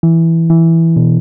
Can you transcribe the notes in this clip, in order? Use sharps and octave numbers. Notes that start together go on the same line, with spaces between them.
E3
E3
B2